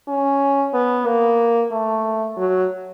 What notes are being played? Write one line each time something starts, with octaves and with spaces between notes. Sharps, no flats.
C#4
B3
A#3
A3
F#3